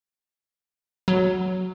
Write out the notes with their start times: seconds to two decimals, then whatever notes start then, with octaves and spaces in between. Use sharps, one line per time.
1.08 F#3